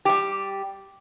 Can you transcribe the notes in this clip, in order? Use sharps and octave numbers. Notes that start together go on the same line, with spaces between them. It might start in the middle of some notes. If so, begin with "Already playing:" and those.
G3 G4